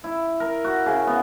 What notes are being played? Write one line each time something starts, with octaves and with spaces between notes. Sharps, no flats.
E4
A#4
F#4
C#3
B3